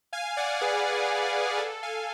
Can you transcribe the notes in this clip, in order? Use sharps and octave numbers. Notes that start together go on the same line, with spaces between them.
F5 G#5
D5 F#5
G#4 B4
A4
F5 G#5